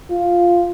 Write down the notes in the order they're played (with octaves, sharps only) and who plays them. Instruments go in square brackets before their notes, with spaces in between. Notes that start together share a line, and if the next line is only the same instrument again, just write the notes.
[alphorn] F4